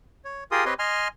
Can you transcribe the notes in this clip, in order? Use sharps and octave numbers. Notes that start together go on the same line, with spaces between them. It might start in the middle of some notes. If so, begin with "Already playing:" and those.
C#5
F4 G4 G#4 A#4 C6 D#6
C4 G4 B4 C#5 D#5 C6
D#5 G#5 C6 F6